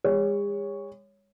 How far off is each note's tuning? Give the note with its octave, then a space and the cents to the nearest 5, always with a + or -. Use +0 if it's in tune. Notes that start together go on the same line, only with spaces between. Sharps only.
G#3 -45 C#5 +5